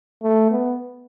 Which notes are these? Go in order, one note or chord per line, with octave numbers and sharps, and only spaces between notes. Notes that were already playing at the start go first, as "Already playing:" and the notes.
A3
B3